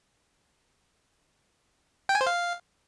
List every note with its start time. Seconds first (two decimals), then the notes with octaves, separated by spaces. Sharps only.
2.09 G5
2.15 G#5
2.21 C5
2.27 F5